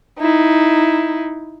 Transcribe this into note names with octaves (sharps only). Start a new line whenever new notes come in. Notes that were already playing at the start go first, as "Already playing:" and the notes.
D#4 E4